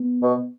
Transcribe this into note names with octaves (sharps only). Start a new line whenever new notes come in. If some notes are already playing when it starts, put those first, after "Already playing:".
Already playing: B3
B2